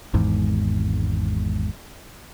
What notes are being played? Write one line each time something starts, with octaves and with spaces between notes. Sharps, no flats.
G#1 E2 G#2